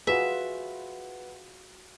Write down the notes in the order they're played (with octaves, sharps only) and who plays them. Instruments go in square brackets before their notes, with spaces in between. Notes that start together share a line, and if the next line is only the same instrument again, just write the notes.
[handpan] F4 F#4 G#4 [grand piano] B4 F#5 [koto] E5